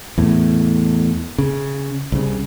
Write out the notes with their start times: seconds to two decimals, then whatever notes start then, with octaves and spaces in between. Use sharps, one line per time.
0.18 E2 A2
1.38 C#3
2.12 C2 C#3